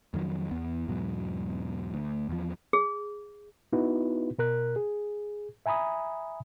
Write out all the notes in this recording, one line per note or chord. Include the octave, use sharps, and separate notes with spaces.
F2 D#3 F#3
E2 B3
E2 G#2 B2 F#3
D2
E2 F3
G#4
B3 D#4 E4 F#4 B4
B2 A#4 F#6
G#4
E5 G#5 A#5 B5 D#6